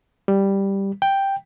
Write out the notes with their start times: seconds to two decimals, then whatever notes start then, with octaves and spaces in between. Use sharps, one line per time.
0.28 G3
1.02 G5